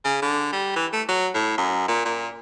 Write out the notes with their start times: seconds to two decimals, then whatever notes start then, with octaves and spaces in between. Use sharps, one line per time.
0.05 C#3
0.22 D3
0.52 G3
0.76 E3
0.93 A3
1.09 F#3
1.35 A2
1.58 F#2
1.88 A#2
2.05 A#2